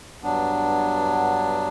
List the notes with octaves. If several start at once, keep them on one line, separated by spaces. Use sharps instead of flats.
G2 F#3 B3 D4